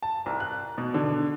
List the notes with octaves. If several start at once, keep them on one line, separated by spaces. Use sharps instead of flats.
A5
C2
F#6
B2
D3